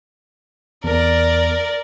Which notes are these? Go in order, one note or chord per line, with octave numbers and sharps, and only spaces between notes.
E2 A#4 D5